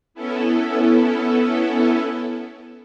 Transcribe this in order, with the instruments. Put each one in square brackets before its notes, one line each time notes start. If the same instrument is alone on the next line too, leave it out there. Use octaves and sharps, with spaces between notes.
[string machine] B3 C#4 E4 A4